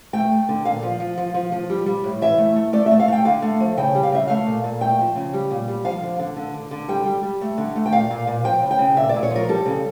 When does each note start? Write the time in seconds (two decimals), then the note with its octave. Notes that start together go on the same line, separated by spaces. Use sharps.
0.13 A3 G5
0.32 A3
0.49 D3
0.65 A#2 F5
0.83 F3
1.00 F3
1.17 F3
1.34 F3
1.52 F3
1.70 G3
1.86 G3
2.04 A2
2.21 E3 E5
2.38 A3
2.56 A3
2.73 A3 D5
2.86 E5
2.91 A3
3.00 F5
3.08 A3 G5
3.25 D3 F5
3.42 A3
3.60 F3
3.77 C#3 G5
3.95 G3
4.03 F5
4.12 C#3 E5
4.27 A3 F5
4.46 A#2
4.64 A#2
4.81 A3 G5
4.99 F3
5.16 C#3
5.33 G3
5.51 A#2
5.68 G3
5.85 F3 F5
6.02 D3
6.19 D3
6.36 D3
6.54 D3
6.71 D3
6.88 G3 G5
7.06 G3
7.23 G3
7.41 A3
7.58 D3
7.75 A3
7.86 G5
7.92 A#2 F5
8.11 A#2
8.27 A#2
8.44 F3 G5
8.62 C#3
8.71 G5
8.79 C#3
8.96 A#2 E5
9.09 A#2 D5
9.23 C#5
9.31 F3
9.36 A#4
9.48 G3 A4
9.66 C#3